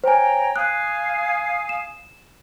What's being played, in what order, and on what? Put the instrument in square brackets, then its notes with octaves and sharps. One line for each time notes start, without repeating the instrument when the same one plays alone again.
[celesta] C5 G#5 [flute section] C#5 G5 A#5
[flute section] F5 G#5 D#6 [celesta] F#6
[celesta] E7